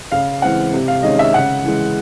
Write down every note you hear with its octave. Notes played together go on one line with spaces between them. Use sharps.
C#3 F5
E3 G#3 C4 F#5
C3
F5
D#3 G#3 C#4 D#5
E5
C#3 F#5
E3 G#3